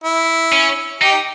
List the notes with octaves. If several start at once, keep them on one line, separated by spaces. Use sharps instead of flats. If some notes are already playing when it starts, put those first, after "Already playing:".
E4
C#4
D#4 G4